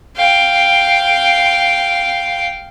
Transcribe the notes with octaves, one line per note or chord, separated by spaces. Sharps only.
F5 G5